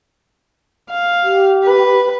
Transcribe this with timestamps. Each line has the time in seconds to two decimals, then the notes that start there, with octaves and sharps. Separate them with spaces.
0.90 F5
1.23 G4
1.64 B4